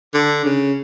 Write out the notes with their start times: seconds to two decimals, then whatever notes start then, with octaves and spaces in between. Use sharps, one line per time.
0.14 D3
0.45 C#3